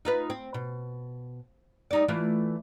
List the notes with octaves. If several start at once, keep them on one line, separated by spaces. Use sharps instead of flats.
D#4 F4 B4
C4
B2
G3 D#4 D5
E3 A3 F4